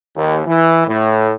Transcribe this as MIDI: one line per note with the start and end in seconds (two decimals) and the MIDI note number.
0.16 0.40 39
0.47 0.86 52
0.87 1.32 45